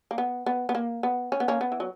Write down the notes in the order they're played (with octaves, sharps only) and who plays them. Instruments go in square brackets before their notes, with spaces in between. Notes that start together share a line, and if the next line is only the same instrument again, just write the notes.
[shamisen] A#3
B3
B3
B3
A#3
B3
C#4
B3
A#3 C#4
B3
E3
F#3